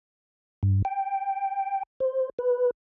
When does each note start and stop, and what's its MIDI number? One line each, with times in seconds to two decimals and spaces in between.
0.63 0.82 43
0.85 1.83 79
2.00 2.29 72
2.39 2.71 71